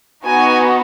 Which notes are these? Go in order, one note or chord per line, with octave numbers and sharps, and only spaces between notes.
B3 D#4 F#4 G#5